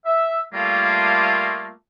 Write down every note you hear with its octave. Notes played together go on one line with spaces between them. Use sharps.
E5
G3 A3 A#3 F4